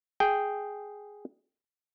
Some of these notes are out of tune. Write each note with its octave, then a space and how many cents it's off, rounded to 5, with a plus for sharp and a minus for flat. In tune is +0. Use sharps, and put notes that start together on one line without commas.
G#4 +0 G5 +0